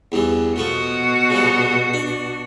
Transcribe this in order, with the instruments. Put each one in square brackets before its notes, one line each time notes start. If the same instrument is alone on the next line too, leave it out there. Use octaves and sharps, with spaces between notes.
[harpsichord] E2 G2 E3
[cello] B2 F#4 [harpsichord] F3 A3 B3
[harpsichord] C#3 F3 G3
D4